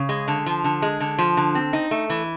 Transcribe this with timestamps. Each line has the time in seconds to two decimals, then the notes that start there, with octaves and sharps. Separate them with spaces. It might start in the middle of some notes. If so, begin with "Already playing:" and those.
Already playing: C#3
0.09 G#3
0.28 D3
0.46 F3
0.64 D3
0.82 G#3
1.00 D3
1.19 F3
1.37 D3
1.55 C4
1.73 D#4
1.91 A3
2.10 E3